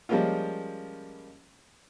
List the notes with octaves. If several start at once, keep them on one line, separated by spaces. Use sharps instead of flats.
F3 G3 G#3 A#3 C#4 F4